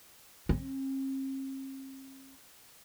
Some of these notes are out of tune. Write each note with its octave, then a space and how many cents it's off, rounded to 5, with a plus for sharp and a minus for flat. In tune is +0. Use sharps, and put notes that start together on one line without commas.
C4 +45